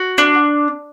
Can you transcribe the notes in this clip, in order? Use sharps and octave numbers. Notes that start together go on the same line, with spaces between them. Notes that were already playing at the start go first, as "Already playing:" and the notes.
Already playing: F#4
D4